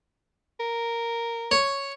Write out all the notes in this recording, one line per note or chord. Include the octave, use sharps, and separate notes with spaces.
A#4
C#5